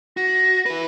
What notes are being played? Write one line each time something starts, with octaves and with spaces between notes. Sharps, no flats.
F#4 A#6
E4 B4